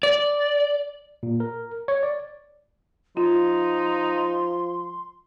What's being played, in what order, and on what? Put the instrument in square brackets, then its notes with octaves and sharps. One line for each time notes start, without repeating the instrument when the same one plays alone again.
[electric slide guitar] D5
[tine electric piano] A#2
A#4
C#5
D5
[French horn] F3 [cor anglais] D#4 [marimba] F4 [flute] C6